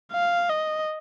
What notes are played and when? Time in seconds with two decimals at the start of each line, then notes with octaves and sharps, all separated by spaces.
0.12 F5
0.49 D#5